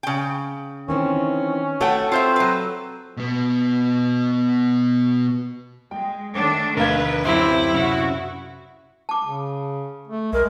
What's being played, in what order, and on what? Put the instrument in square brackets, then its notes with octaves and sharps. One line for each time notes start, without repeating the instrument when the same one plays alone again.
[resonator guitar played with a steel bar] C#3 G5
[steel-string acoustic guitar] D#3 E3 C4 [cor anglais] C#4
[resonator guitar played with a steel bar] A3 F#5 G5 [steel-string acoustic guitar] F#4 A4 C#5
[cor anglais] C4 [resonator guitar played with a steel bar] F4 C5 E5
[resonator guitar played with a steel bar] F#3 B4
[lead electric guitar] B2 B3
[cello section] G#3 [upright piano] G5
[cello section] D#3 A3 D4
[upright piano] D2 F5 G#6 [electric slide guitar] D4 A#4 [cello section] B4
[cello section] F#2 C4 [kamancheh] E4 [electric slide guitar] G4 C5
[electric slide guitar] C3 C#4 [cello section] F#4
[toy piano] A5 D6
[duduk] C#3
A3
[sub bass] B1 [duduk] G#3 [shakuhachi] A#4